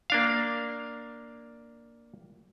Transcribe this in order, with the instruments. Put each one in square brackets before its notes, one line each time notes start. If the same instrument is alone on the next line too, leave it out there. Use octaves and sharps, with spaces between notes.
[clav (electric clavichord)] A#3 D4 F5